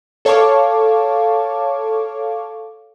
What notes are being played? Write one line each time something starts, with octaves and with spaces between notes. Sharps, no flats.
A4 C#5 F5 A5 C#6 D6